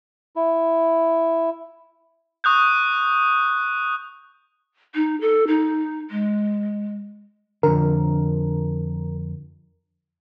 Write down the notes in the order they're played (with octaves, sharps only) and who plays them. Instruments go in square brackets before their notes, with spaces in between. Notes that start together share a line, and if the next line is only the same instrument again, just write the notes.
[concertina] E4
[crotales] C#6 D#6 F#6 G6
[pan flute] D#4
A4
D#4
G#3
[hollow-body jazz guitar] F2 D3 [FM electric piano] A#4